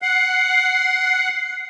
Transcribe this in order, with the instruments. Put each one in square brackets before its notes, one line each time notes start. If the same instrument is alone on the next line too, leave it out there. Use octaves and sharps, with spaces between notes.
[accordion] F#5 [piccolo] C7